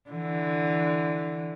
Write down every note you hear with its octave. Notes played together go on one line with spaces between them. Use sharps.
D3 E3